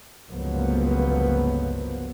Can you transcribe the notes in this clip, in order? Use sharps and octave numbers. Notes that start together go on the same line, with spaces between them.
G1 C#2 F3 F#3 A#3 B3